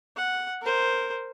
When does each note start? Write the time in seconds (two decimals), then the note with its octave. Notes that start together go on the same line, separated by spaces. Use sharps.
0.16 F#5
0.61 A#4 C5